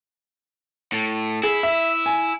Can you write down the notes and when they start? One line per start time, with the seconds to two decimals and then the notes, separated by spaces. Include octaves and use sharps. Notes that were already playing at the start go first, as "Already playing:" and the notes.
0.92 A2
1.43 E4 G#4
1.63 E5
2.06 G#5